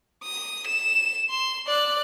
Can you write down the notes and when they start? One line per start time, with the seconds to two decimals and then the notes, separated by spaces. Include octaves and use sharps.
0.23 D#6
0.67 E7
1.30 C6
1.67 D5 F#6